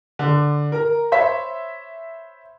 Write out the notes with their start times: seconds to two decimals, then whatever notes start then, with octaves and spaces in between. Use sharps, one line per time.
0.19 D3
0.72 A#4 A#5
1.12 C5 C#5 E5 B5 B6